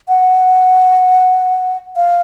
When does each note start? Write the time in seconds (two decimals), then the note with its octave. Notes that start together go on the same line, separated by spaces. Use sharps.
0.08 F#5
1.96 F5